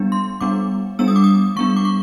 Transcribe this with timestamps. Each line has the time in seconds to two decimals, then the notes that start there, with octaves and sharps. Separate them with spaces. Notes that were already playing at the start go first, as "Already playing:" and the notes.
Already playing: G3 B3 D4
0.12 C6
0.41 G3 B3 D4 D6
0.99 G3 B3 D4 E6
1.08 D#6
1.16 D6
1.24 D#6
1.56 G3 B3 D4 C#6
1.76 D6
1.85 C#6